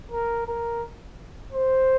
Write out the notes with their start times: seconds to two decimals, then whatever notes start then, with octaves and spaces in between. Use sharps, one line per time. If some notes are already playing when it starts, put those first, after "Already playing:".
0.11 A#4
0.47 A#4
1.52 C5